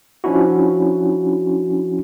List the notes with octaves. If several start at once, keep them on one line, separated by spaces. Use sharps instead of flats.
F3 C#4 D4 E4 F#4